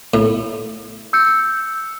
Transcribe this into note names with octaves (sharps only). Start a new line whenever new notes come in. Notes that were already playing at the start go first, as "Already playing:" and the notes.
A2
E6 G6 C#7